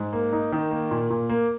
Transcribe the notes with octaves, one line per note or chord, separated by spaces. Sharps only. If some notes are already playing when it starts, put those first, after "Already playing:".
Already playing: G#2
A#3
D#4
D#3
A#3
A#2
A#2
A#3